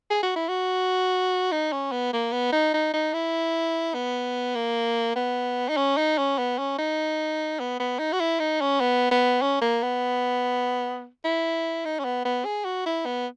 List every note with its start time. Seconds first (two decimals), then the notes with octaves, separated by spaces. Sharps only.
0.11 G#4
0.23 F#4
0.36 E4
0.49 F#4
1.52 D#4
1.73 C#4
1.92 B3
2.13 A#3
2.32 B3
2.52 D#4
2.74 D#4
2.93 D#4
3.13 E4
3.94 B3
4.55 A#3
5.16 B3
5.69 D#4
5.77 C#4
5.97 D#4
6.18 C#4
6.38 B3
6.58 C#4
6.78 D#4
7.60 B3
7.80 B3
7.99 D#4
8.12 F#4
8.20 E4
8.40 D#4
8.61 C#4
8.81 B3
9.11 B3
9.42 C#4
9.61 A#3
9.83 B3
11.24 E4
11.85 D#4
11.99 C#4
12.04 B3
12.25 B3
12.45 G#4
12.65 F#4
12.86 E4
13.06 B3